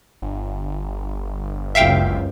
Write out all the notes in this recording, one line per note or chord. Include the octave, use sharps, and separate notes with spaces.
G1
F#1 C#2 F#2 E5 F5 G5